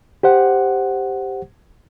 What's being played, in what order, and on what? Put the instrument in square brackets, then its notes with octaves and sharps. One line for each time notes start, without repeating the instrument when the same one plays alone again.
[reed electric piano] G4 C5 F#5